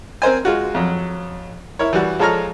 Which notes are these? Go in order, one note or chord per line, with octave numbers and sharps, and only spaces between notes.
C4 A#4 C5 G#5
G#3 F4 F#4
F2 F#3
E4 A#4 C#5
E3 G3 F#4
F3 G#3 A4 C#5 A#5 F6